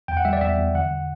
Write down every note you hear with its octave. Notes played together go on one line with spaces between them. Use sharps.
E2 G5
F#5
G3 E5
D5
E2 E5
E2
D3 F#5